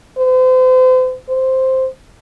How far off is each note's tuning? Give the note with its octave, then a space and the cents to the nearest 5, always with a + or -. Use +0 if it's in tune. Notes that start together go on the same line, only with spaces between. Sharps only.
C5 -40
C5 +0